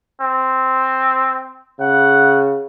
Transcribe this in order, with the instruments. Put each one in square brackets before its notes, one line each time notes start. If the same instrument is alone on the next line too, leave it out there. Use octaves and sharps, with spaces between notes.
[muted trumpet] C4
[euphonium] C#3 [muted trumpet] F#5